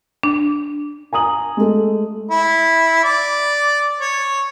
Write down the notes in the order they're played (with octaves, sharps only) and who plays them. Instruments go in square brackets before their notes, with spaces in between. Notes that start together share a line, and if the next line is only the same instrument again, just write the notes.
[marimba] D4
[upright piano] G#5 A#5 D#6 F#7
G#3 A3
[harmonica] E4
D5
C#5